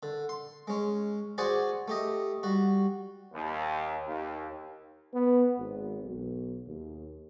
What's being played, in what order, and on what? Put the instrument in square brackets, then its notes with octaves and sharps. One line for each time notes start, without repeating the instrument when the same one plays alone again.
[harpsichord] D3
C6
G#3 C#4
F#4 G#4 C5 D5 F#5 G#5
A3 G4 D#5
G3 F#4
[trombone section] D#2
D#2
[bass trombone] B3
G#1
B1
D#2